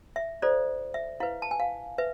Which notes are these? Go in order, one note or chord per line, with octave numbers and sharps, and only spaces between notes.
E5
F4 A4 C5 D5
E5
E4 B4 F5
A5
G#5
F5
B4 E5